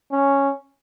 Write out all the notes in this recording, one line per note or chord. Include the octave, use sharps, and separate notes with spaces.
C#4